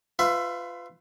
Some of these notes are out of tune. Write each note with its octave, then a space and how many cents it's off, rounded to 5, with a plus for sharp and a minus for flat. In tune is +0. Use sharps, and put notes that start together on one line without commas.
F4 +0 B4 +30 E5 +20